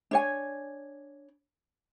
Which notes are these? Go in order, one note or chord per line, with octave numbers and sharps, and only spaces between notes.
D4 C#5 G#5